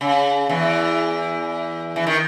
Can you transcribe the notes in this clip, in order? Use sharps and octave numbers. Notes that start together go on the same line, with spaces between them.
C#3
E2 E3
E3
D#3